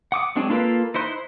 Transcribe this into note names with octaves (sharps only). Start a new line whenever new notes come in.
F#5 D6 D#6
F#3 G#3 C4 D4 G#4
A#3 F4 A4 B4
D#4 E4 C5 C6 F#6